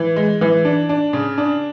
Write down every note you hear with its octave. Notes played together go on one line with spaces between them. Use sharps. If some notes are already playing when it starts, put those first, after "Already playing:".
Already playing: E3
G#3
E3
D4
D4
C#3
D4